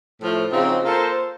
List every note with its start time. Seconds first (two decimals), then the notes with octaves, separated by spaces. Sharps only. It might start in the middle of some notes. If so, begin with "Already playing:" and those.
0.21 A2 F3 A3
0.52 C#3 F3 C4 D#4 F#4
0.84 A#3 F4 A4 C5